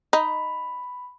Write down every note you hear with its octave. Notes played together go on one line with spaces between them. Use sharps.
D#4 B5